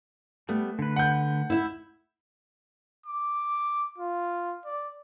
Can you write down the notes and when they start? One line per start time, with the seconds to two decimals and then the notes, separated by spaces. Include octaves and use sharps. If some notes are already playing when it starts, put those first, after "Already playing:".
0.49 G3 A3 B3
0.79 D3 B4
0.96 F#5 G6
1.50 E4 E5
3.06 D6
3.98 F4
4.66 D5